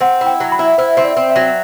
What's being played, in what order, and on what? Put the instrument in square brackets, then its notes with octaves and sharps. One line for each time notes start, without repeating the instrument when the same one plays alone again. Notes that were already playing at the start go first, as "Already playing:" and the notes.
[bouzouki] C4 [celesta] F#5
[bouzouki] E4
[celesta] G5
[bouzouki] F#3
[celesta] B5
[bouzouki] E4
[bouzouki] E4 [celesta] C5
[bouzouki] C4 [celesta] E5
[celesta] D5
[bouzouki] C4
[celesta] E5
[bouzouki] F#3